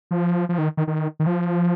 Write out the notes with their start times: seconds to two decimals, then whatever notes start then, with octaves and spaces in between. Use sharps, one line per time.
0.11 F3
0.49 F3
0.58 D#3
0.77 D#3
0.87 D#3
1.20 D#3
1.27 F3